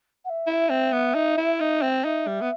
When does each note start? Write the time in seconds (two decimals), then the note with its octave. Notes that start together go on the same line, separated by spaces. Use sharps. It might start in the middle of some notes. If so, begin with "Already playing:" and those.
0.24 F#5
0.29 E5
0.47 E4
0.70 C4
0.93 B3
1.15 D#4
1.37 E4
1.60 D#4
1.82 C4
2.04 D#4 E5
2.27 G3
2.41 B3